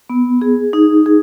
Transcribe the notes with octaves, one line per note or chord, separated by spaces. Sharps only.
B3
G#4
D#4
G#4